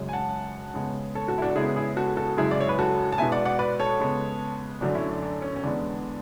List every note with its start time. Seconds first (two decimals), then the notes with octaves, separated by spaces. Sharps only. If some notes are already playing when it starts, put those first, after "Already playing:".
Already playing: F#2 C#3 G#3
0.09 G#5
0.13 F#5 A5
0.74 C#3 G#3 B3
1.15 A4 C#5
1.28 F#4 A4
1.38 E4
1.42 D4 F#4
1.50 A4
1.56 C#3 G#3 B3 E4 G#4
1.76 E4 G#4
1.97 F#4 A4
2.17 F#4 A4
2.37 F#2 C#3 G#3 E4 G#4
2.51 D5
2.61 C#5
2.69 B4
2.79 F#4 A4
3.12 A5
3.18 B2 G#3 B3 E5 G#5
3.32 D5 F#5
3.45 D5 F#5
3.59 B4 D5
3.80 A4 C#5
4.00 C#3 G#3 B3
4.81 F#2 D3 A3 D4 F#4
4.95 C#4 E4
5.09 D4
5.22 D4
5.42 C#4
5.56 C#4
5.63 E2 D3 G#3 B3 D4